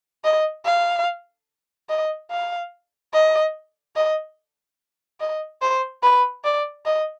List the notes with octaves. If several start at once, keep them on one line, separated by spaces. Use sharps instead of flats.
D#5
F5
D#5
F5
D#5
D#5
D#5
C5
B4
D5
D#5